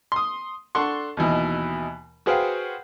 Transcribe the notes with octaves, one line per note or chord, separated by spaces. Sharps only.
C6 D#6
D4 A4 F#5 C6 C#6
D#2 B2 E3 D#4
F#4 G#4 B4 C5 F5 G5